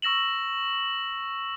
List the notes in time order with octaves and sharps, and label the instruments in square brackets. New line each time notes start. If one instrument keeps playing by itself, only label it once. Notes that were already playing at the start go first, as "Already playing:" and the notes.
[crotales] C#6 E6 A#6 E7 F#7